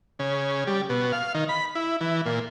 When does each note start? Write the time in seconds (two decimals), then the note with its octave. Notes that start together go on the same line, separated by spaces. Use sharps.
0.19 C#3
0.67 G3
0.89 B2
1.12 F5
1.35 D#3
1.49 B5
1.75 E4
2.01 E3
2.26 A#2